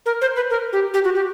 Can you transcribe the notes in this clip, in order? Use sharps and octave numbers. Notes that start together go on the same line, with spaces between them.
A#4
C5
B4
A#4
G4
G4
F#4
G4